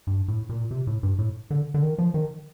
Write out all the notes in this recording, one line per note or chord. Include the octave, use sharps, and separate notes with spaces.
G2
A2
A#2
C3
A2
G2
A2
D3
D3
D#3
F3
D#3